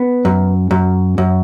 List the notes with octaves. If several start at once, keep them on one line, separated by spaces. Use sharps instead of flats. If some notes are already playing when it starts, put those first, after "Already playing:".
Already playing: B3
F#2
F#2
F#2